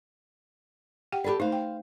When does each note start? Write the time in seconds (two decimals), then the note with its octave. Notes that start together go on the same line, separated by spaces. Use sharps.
1.12 G4 F#5 G5
1.24 G4 A4 B4 D5 B5
1.40 A3 D#4 C5 F5
1.52 G5